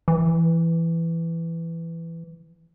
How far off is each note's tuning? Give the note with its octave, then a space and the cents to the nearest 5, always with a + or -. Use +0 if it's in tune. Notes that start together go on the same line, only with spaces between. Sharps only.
E3 +10